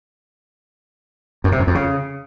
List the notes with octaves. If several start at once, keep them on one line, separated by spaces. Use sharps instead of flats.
F#2
C3
F#2
F2
C#3